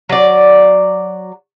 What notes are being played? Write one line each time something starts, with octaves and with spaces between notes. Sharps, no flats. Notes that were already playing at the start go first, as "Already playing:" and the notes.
F#3 D5